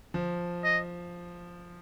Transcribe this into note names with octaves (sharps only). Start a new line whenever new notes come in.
F3
D#5